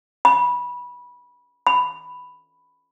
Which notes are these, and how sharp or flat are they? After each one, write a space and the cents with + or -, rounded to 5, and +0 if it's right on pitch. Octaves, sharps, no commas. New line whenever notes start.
B5 -15
B5 +5